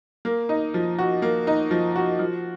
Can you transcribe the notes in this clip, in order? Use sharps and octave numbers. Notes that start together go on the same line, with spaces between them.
A#3
D#4
F3
F#4
A#3
D#4
F3
F#4
F3